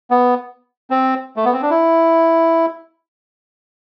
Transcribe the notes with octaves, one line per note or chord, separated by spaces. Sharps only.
B3
C4
A3
B3
C4
D4
E4